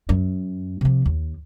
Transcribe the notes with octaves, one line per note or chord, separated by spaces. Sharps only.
F#2
C3 F3
D#2